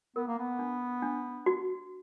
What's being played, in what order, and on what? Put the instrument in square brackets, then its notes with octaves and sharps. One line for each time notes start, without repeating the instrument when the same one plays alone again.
[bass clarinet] B3 [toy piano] A#4
[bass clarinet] A#3
B3
[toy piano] D4
D4
F#4